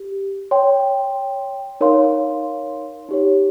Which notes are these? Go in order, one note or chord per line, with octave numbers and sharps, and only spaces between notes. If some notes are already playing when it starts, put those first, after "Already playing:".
Already playing: G4
C#5 G5 C6
D#4 A#4 C#5 F5 C6
D#4 G4 C#5